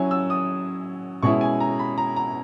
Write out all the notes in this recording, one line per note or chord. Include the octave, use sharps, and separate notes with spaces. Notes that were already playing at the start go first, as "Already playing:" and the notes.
Already playing: F#3 C#4 E4 G#5
E6
D#6
B2 G#3 C#4 E4 C#6
G#5
A#5
B5
A#5
A#5